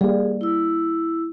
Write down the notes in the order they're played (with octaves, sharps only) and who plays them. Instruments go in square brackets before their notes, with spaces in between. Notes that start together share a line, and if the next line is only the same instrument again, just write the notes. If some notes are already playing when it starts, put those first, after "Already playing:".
[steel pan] G3 A#3 [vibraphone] G#4
[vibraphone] E4 E6